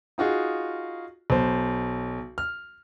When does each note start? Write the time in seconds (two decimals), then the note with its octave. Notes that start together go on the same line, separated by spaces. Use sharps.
0.18 D#4 F4 F#4 G#4
1.30 B1 C5
2.38 F6